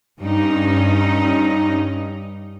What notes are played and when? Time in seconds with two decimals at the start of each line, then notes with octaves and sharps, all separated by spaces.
0.21 G2 C#4 D#4